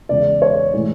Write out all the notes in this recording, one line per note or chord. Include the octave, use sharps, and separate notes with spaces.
E2 C#3 G#3 D5
C#5
A2 E3 G#3